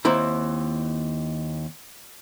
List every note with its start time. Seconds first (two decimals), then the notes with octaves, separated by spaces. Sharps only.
0.05 D#2 C4 E4 A#5